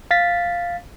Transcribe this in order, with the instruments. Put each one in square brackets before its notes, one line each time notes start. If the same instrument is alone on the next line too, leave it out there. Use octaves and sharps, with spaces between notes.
[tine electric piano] F5 A6 B6